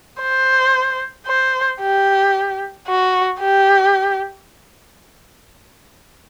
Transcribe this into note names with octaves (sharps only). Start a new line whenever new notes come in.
C5
C5
G4
F#4
G4